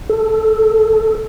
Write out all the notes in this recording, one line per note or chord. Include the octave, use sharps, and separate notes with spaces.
A4